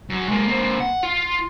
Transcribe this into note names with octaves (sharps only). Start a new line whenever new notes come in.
F#2 F#3
G#3 A#3
A#3 C4
F#5
F4